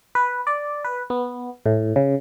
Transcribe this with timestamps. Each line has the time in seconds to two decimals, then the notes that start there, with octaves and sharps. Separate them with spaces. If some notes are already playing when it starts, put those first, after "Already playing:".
0.15 B4
0.47 D5
0.85 B4
1.10 B3
1.66 A2
1.96 C#3